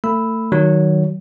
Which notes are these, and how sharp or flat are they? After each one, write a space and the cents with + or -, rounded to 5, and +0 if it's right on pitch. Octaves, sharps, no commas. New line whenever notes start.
A3 +30 B5 +5 E6 -10
D#3 +0 F#3 +15